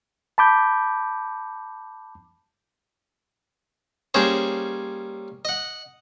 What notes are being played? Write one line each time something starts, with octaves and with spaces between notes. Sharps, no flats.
A5 B5 D6 G6
G3 A#3 C#4 G#4 C5
D#5 F#5